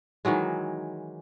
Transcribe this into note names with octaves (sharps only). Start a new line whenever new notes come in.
D#3 E3 F#3 G#3